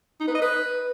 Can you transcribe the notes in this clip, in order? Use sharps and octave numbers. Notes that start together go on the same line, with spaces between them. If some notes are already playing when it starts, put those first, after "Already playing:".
D#4
B4
D#5
B4